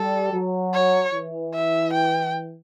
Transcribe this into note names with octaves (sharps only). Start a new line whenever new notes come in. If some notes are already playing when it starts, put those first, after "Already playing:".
Already playing: G3 A4
F#3
C#5
E3
E5
G5